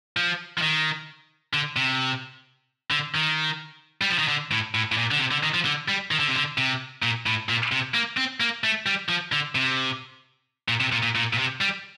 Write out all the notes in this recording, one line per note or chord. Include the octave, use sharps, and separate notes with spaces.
F3
F3
D#3
D3
C3
D3
D#3
G3
F3
D#3
D3
A2
A2
A2
A#2
D3
C3
D3
D#3
F3
D3
G3
D#3
D3
C3
D3
C3
A#2
A2
A#2
C3
A#3
C4
A#3
A3
G3
F3
D3
C3
A#2
C3
A#2
A#2
A#2
A#2
C3
G3